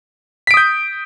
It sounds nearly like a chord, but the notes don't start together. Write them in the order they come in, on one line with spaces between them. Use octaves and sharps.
B6 D7 D#6 G6